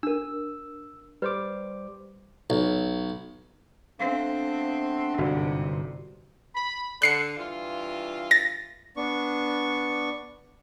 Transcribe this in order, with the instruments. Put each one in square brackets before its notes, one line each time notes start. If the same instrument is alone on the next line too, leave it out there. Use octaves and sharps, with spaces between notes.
[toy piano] D4 A#4 [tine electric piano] E6
[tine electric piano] G3 C5 D6 [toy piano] B4
[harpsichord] B1
[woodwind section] A3 B3 D4 [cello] C4 [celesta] F5
[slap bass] G1 [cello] G#2 C3 [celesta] F#4 D5
[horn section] B5
[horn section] D3 [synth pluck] F#6 C7 C#7
[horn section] G2 E3 F4
[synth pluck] A6 A#6
[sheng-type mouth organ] B3 D4 C#6